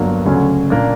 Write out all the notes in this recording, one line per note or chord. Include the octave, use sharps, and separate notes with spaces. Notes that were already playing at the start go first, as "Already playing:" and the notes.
Already playing: G1 G2 F#3 A#3 D4
D2 C#3 F#3 C#4
A#2 A#3 D4